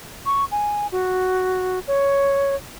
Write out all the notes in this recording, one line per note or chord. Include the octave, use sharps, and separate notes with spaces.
C#6
G#5
F#4
C#5